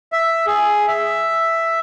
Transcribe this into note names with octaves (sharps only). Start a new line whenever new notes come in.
E5
G#4
E5